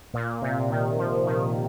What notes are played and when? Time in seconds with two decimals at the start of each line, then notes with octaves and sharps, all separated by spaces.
0.14 A#2
0.42 C3
0.70 D#3
0.98 F3
1.26 D#3